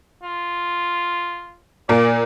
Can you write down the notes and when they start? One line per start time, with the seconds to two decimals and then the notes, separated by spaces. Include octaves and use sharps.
0.23 F4
1.89 A#2 A#3 D5